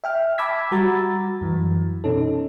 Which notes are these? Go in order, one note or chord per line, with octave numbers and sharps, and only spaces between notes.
E5 G5 F6
A5 B5 D6 E6 G#6 B6
G3 F#4 A#5 B5 A6
F#2 E3
B2 C#4 D#4 A4